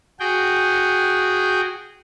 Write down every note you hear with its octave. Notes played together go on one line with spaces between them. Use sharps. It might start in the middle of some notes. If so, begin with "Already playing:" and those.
F#4 G#4 G5